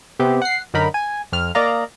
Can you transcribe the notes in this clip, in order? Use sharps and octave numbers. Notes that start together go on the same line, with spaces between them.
C3 B3 C4 G4
F#5 C7
F#2 D3 D#4 A#4 B5
G#5
F2 F6
A#3 D5 D#5 F5 A#5